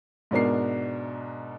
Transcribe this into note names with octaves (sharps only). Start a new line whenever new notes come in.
G#2 B2 D4 A#4 C7